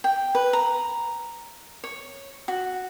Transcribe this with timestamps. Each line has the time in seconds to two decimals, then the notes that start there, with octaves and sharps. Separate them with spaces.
0.04 G5
0.35 B4
0.53 A#5
1.84 C#5
2.48 F#4